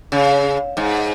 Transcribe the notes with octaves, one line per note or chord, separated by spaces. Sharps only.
C#3
G#2